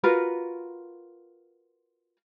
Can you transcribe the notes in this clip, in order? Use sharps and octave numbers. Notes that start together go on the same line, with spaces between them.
F4 F#4 A#4 B4